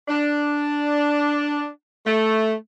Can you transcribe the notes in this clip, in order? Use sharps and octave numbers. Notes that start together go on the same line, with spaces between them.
D4
A3